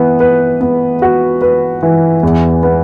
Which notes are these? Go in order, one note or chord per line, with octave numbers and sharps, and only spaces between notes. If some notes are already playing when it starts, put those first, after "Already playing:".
Already playing: E3 B3
B4
B3
F#4
B4
E3
E2
B3